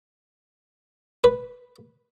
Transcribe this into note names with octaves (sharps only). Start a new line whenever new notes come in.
B4